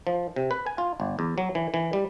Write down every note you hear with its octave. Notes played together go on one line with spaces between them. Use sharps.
F3
C3
B4
G#5
F4
G1
E2
F#3
E3
E3
G3